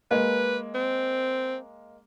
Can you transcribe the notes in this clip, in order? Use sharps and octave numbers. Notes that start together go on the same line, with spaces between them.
G#3 A#3 B4
C4